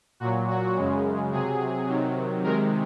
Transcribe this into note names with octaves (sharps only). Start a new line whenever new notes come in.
A#2 F#3 F#4
F#4
F#2 C#3 G#3
C3 F#3 G#4
C3 D#3 F#3
C3 D#3 G#3 A#4